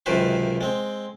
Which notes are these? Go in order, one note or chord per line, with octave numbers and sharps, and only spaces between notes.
C#2 F#2 C3 D#3 B4 C5
G#3 C4